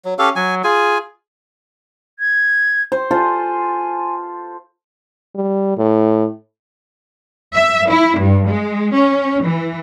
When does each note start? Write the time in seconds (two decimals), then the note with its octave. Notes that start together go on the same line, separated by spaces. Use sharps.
0.05 F#3
0.19 C#4 G4 A4 F5
0.36 F#3 G#5
0.64 F4 G#4 G#5
2.19 G#6
2.92 C5
3.11 F4 A4 C5 G#5
5.35 G3
5.78 A2
7.54 E5
7.89 E4
8.18 G2
8.47 G#3
8.94 C#4
9.43 E3